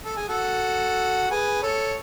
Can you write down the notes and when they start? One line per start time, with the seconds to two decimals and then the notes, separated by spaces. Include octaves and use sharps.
0.05 A4
0.17 G#4
0.29 F#4 A4
1.31 G#4 B4
1.62 A4 C#5